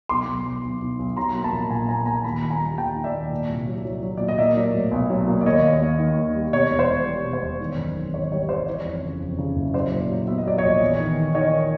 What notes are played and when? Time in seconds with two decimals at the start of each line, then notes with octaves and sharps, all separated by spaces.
0.09 B1 C6 D6
0.28 B1
0.45 B1
0.64 B1
0.82 B1
0.99 B1
1.17 F#3 A#5 C6
1.35 A#3
1.44 A5 B5
1.52 A#1
1.70 A#2 G#5 A#5
1.89 A#3 G#5 A#5
2.06 A#2 G#5 A#5
2.24 D#2 A5 B5
2.41 D#2
2.50 G#5 A#5
2.60 G3
2.78 D#2 G5 A5
2.95 D#3
3.04 D5 E5
3.13 D#2
3.31 A#2
3.49 C2
3.67 F#3
3.85 F#3
4.03 F#3
4.17 A#2 D5
4.28 D#5
4.38 A#3 D5 E5
4.57 F#3
4.74 A2
4.92 B1
5.10 F#3
5.28 A#3
5.41 D5
5.45 D#2 C#5 D#5
5.64 D#2
5.82 D#2
5.99 D#3
6.17 D#2
6.35 G3
6.53 B2 C#5
6.70 E1
6.79 C5 D5
6.89 E2
7.06 G3
7.24 B2
7.33 C5
7.42 E1
7.60 D#3
7.77 F#2
7.96 G#1
8.14 D#3 C#5
8.32 G3 C#5
8.49 G3 C5 D5
8.67 E3 C#5
8.85 F2
9.03 C#3
9.20 F2
9.38 C#3
9.56 F#1
9.74 F#3 C5 D5
9.92 A#2
10.10 F#3
10.27 B3 E5
10.38 D#5
10.46 F#3 D5
10.58 C#5 D#5
10.63 A#1
10.81 E2
10.99 D#3
11.17 D#3
11.35 D#3 C#5 D#5